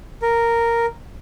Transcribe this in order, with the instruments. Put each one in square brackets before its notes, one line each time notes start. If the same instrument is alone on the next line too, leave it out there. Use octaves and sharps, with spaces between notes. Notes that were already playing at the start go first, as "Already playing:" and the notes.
[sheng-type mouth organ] A#4